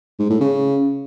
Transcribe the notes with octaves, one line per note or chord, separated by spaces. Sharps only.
G#2
A2
C#3